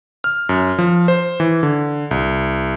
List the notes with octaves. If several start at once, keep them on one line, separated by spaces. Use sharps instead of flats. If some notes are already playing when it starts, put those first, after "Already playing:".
F6
F#2
F3
C5
E3
D3
C2